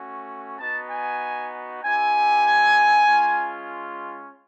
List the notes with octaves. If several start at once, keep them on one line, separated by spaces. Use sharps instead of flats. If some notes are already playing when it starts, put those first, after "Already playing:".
Already playing: A3 C#4 F#4
B3 D#4 F#4 A5
G#5
C4 E4 G4 G#5
G#3 C#4 F4